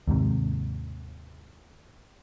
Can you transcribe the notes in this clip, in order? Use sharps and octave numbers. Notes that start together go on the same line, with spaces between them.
D#2 G#2 C3